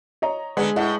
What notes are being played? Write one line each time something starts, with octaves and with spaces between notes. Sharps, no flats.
C#5 D#5 A#5
D3 G#3 B3
A2 E4 D#5 F#5